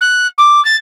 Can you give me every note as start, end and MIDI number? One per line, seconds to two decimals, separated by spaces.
0.01 0.27 90
0.38 0.63 86
0.65 0.76 93